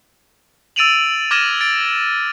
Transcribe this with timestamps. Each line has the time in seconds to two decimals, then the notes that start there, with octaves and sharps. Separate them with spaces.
0.76 E6 A6 D7 D#7 F7 F#7
1.31 D6 F6 G#6 A#6 D#7 E7
1.61 A6 D7